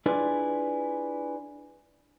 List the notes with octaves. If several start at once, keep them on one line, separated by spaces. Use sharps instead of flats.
D4 E4 F4 G#4 B4 D5